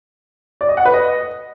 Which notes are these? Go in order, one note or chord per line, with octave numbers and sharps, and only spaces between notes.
D5
D#5
F#5
B4
D#5